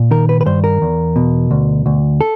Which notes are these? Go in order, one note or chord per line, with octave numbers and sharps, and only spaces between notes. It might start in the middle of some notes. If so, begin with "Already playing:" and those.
Already playing: A#2
D#3 A#4
B4
B4
G2 C5
A#4
E2
B2
D2
D2
A4